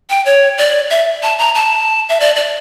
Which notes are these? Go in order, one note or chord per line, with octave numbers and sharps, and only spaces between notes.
G5
C#5
D5
E5
A5
A#5
A5
E5
D5
D5